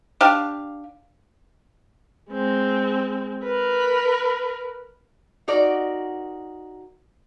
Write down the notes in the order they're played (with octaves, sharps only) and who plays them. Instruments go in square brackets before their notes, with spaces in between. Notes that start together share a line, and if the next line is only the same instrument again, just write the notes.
[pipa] D4 G4 F5
[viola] G#3 C4
A#4 B4
[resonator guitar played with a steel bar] D#4 F#4 A#4 D5